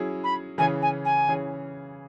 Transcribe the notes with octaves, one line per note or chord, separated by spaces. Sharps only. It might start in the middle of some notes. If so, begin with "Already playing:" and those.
Already playing: F#3 C#4 E4 G#4
B5
C#3 E3 C#4 G#4 C#5 G#5
G#5
G#5
C#3 E3 C#4 G#4 C#5